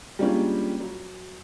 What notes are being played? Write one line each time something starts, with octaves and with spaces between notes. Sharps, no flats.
G3 G#3 A#3 C#4 D4 F4
F#3